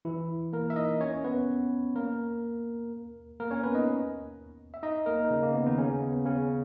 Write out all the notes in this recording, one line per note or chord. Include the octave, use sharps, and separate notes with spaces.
E3 E4
A#3 A#4
E5
D#4 D#5
C#4 C#5
B3 B4
A#3 A#4
A#3 A#4
C#4 C#5
B3 B4
D#4 D#5
E5
D#4 D#5
A#3 A#4
D#4
C#3 C#4
A#3
B3
D#3 D#4
C#3 C#4
B3
C#3 C#4